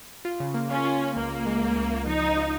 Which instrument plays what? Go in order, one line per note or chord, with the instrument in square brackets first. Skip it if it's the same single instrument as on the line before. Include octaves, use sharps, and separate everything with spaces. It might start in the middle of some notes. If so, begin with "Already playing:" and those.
[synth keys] F4
C#3
A#3
[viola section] C#4 [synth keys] F4
[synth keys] F4
F4
[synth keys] C#2 [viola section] A#3
[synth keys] C#2
G#3
C#2
C#2
C#2
[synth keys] F3 [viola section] D#4
[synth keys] F3
F4